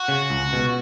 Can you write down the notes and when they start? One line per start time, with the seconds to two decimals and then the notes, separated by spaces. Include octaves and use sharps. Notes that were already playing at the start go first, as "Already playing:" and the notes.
Already playing: F#4
0.08 C#3
0.30 C#2
0.53 B2